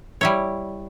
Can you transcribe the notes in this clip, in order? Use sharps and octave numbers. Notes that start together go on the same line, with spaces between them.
G3 E4 C#5